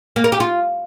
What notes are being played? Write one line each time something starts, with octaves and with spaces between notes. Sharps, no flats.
A#3
A#4
G4
F4